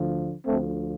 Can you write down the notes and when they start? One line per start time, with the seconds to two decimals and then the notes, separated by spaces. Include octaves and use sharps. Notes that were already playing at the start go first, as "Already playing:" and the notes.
Already playing: D2 D3 F3
0.46 D2 D3 F3 A3 C4